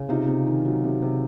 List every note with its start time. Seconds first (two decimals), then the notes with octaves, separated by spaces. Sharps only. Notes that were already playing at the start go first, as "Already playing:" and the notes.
Already playing: C#3
0.09 C3 D#4 F4
0.28 C3
0.47 D#3
0.65 F#3
0.84 C3
1.02 C3